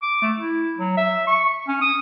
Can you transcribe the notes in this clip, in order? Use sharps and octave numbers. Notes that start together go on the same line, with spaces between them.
D6
A3
E4
F#3
E5
C#6
C#4
D#6